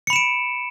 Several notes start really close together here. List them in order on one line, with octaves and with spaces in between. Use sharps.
C#7 B5 E7 D7